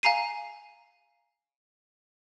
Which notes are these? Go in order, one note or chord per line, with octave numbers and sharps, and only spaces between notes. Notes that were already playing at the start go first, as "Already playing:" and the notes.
F5 G#5 A#5 C7 D#7